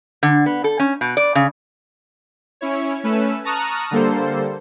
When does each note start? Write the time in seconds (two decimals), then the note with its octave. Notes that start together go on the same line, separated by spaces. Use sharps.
0.23 D3
0.46 B3
0.64 A4
0.79 C#4
1.01 B2
1.17 D5
1.35 C#3
2.61 C#4 E4 C#5
3.03 A3 C#4 B4 E6
3.44 A5 A#5 C#6 D#6 F6 F#6
3.91 D3 G3 A#3 A4 C5